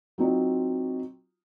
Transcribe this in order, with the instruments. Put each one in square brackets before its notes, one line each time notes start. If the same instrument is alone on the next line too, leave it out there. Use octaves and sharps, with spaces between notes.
[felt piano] F#3 C4 D#4 F4